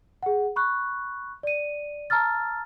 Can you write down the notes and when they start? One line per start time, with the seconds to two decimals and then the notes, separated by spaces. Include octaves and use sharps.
0.23 G#4 F#5
0.56 B5 C#6 F#6
1.43 D5 D#7
2.10 A5 A#5 E6 F6 A6